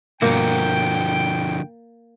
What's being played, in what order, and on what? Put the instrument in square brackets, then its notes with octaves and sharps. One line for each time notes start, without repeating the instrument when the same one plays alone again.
[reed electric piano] G2 B2 [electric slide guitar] D3 F3 F#4 [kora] A#3 [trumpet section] G5